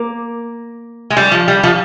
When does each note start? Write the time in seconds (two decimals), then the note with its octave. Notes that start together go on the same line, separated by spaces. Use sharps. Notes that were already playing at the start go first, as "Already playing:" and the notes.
Already playing: A#3
1.10 G#3
1.17 G3
1.31 F3
1.48 G3
1.63 F3